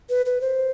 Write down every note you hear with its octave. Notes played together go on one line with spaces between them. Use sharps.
B4
B4
C5